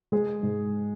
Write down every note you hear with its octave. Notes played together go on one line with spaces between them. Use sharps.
G#3 G#4
G#2